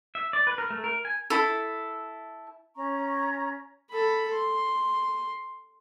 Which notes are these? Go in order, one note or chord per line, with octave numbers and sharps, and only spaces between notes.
E5
D5
B4
A#4
A3
A#4
G#5
E4 A4
C#4 A#5 C#6
A4 B5
C6